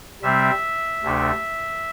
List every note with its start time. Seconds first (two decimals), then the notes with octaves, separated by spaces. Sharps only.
0.22 C3 G3 C4 E5
1.03 D2 C3 A3 D4